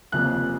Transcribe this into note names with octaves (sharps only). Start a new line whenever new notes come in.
F1 F2 C#3 F3 A#3 F#6